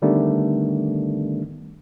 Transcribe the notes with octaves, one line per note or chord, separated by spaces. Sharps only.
D3 D#3 G3 A3 B3 D4